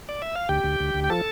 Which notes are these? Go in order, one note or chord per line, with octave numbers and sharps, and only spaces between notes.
D5
E5
F5
D2 G4 G5
D2
D2
D2
G5
F3 A4 A5